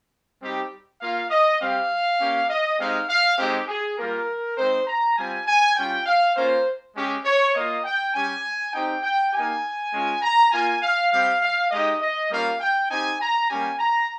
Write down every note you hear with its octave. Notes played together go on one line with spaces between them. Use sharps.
G3 C4 D#4 G4
A#3 F4 F5
D#5
G3 C4 G4 F5
A#3 C#4 G4
D#5
G#3 C4 D#4 G4 F5
F5
G#3 C4 D#4 G4
G#4
G3 A#3 F4 A#4
G#3 C4 D#4 C5
A#5
G3 C4 F4 G#5
G#5
G3 C#4 F4 G5
F5
A#3 C#4 F4 C5
G#3 C#4 G4
C#5
A#3 F4 D#5
G5
G3 C#4 G4 G#5
C4 D#4 G4 G5
G5
A#3 D#4 G4 G#5
G#3 C#4 F4
A#5
A#3 F4 G#5
F5
G3 C4 G4 F5
F5
G#3 D#4 G4 D#5
D#5
G3 A#3 C#4 F4 F5
G5
C4 D#4 G4 G#5
A#5
G3 A#3 C#4 G4 G#5
A#5